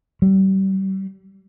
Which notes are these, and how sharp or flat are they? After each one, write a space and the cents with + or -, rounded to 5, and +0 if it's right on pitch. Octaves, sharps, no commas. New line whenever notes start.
G3 -35